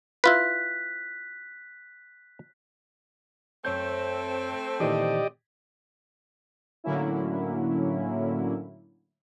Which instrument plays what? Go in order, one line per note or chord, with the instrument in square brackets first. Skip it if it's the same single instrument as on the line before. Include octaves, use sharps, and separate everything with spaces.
[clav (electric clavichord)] E4 F4 B4 [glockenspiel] F#6 B6
[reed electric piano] F#2 C#5 G6 [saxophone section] A3 C4
[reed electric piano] A#2 D#3 E3 [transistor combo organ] G4 D5 D#5
[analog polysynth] A2 D3 F#3 A#3 C#4 E4